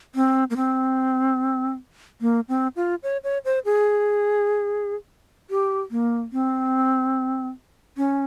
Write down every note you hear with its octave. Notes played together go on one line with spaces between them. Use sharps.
C4
A#3
C4
A#3
C4
F4
C#5
C#5
C5
G#4
G4
A#3
C4
C#4